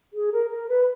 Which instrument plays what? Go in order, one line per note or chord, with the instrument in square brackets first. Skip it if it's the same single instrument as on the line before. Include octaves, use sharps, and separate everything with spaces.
[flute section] G#4
A#4
A#4
B4